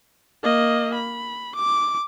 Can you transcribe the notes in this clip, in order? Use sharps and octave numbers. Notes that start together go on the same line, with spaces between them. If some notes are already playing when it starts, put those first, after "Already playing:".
A#3 D#5
B5
D6